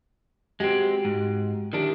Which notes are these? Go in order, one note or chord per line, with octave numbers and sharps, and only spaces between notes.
G#3 C4 F#4 G4
G#2
D#3 G#3 D4 E4 G4